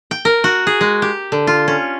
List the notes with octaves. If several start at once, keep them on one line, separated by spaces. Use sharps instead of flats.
G5
A#4
F#4
G#4
G#3
G4
D3
F4
C#4